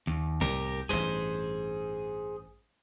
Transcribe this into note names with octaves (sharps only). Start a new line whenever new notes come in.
D#2
C2 A2 G4 A#4
A1 G2 G#4 C5